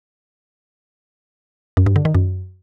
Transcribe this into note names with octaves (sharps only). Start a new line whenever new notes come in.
F#2
G2
D3
D#3
F#2